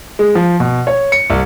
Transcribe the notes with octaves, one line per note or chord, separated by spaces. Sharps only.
G#3
F3
B2
C#5
C#7
C2